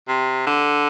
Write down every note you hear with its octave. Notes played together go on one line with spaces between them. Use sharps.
C3
D3